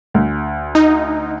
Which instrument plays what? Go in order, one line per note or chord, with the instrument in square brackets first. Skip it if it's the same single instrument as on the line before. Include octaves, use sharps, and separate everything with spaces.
[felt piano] D2
[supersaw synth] D#4